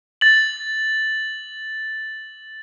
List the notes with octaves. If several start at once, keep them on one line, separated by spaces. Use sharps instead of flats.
A6 F#7